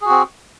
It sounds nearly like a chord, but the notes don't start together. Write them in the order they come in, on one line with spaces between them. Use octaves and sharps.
G#4 F#4 C4